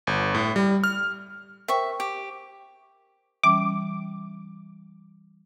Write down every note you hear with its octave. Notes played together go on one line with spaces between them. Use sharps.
G1
A2
G3
F6
A#4 C5 E5 G5 C#6
G4
E3 G3 C#4 D6